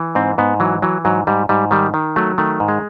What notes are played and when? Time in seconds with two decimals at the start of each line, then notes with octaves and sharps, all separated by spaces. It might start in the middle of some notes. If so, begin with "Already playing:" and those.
Already playing: E3
0.15 G#2 C4
0.38 G#2 B3
0.60 E3 F#3
0.82 E3 F#3
1.05 G#2 F#3
1.27 G#2 G3
1.49 G#2 G3
1.71 D#3 G3
1.94 D#3
2.16 F#3 A3
2.38 D#3 A3
2.60 G#2
2.68 G#3